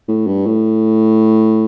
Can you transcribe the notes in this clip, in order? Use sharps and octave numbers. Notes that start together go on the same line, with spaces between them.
A2
G2
A2